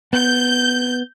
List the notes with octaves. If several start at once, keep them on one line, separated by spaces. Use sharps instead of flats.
B3 G6